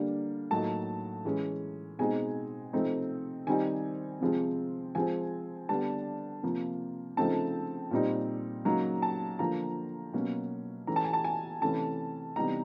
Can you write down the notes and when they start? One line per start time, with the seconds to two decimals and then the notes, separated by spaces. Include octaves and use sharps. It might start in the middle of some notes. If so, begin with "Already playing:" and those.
Already playing: D3 G3 A#3 D4
0.51 A2 F#3 A#3 D#4 A5
1.25 E3 G#3 C#4
1.99 B2 G#3 C4 D#4 G#5
2.73 C3 F3 A3 C4 D#4
3.47 D#3 G3 C4 D#4 G#5
4.21 C3 F3 G#3 C4
4.95 F3 G#3 C4 G#5
5.69 D3 G3 B3 D4 A5
6.43 C3 F3 A#3
7.17 C#3 F3 A3 C4 D#4 A5
7.91 A#2 G3 C4 D#4
8.65 C#3 F#3 A#3 D#4 A#5
9.02 A5
9.39 D3 F3 A#3 A#5
10.13 B2 F#3 A#3 C#4
10.87 E3 A3 C#4 A#5
10.96 A5
11.05 G#5
11.13 A5
11.24 G#5
11.62 C3 E3 A3 C#4 A5
12.36 C3 E3 G3 B3 D#4 A#5